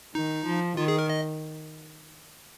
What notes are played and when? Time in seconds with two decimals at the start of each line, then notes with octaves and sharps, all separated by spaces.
0.15 D#3 D#4
0.45 F3
0.77 D#3 F4
0.88 G#4
0.99 A#4
1.10 D#5